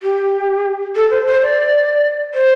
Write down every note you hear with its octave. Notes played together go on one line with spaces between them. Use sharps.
G4
A4
C5
C5
D5
C5